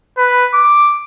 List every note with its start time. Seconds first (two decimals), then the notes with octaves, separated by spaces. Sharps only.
0.17 B4
0.54 D6